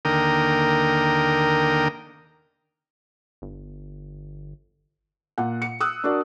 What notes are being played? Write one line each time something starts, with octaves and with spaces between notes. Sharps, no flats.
D#2 D3 A#3 A#4 G5 D#6
G1
A#2 F#5
C#7
D#6 E6 F#6
D4 F#4 A#4 D5